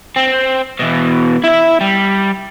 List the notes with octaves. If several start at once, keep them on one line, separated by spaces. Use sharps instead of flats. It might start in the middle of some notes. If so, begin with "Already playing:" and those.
C4
B2 E3
E4 E5
G3